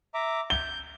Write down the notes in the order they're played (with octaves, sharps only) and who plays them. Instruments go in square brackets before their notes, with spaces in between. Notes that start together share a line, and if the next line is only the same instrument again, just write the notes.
[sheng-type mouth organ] E5 A#5 D6
[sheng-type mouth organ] G6 [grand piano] G7